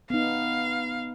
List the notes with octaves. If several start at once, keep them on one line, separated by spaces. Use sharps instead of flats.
B3 D#4 F5